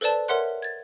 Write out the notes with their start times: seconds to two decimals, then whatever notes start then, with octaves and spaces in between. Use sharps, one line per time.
0.01 A4 B4 C5 D5 A5
0.28 A#4 C#5 E5 F#5 C6 F#6
0.62 G#6 A6